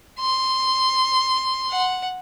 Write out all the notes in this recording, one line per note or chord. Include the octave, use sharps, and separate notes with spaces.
C6
F#5